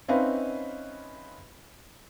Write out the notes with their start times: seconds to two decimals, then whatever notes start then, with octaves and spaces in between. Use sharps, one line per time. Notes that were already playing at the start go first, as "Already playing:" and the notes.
0.08 C4 C#4 D#4 B4 E5 F5